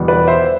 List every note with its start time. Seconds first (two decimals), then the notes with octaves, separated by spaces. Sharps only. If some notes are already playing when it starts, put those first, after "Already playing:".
Already playing: E2 B2 G3 B3
0.08 B4 D5
0.27 C5 E5